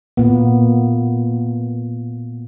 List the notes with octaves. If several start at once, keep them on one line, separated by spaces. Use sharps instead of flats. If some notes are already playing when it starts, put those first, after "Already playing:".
A#2 A#3 B3